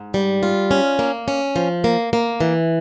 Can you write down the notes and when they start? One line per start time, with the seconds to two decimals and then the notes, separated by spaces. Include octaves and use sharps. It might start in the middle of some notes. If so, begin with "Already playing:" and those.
Already playing: G#2
0.14 G3
0.43 F4
0.71 C#4
0.99 A#3
1.28 C#4
1.56 F3
1.84 A#3
2.13 A#3
2.41 E3